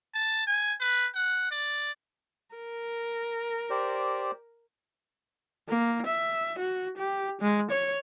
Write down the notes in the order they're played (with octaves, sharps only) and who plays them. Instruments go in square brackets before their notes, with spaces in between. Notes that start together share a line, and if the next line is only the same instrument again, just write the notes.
[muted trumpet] A5
G#5
B4
F#5
D5
[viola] A#4
[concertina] G4 C5 D5
[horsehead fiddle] A#3
E5
F#4
G4
G#3
C#5